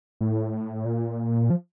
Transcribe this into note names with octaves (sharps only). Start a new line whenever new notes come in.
A2
A#2
F3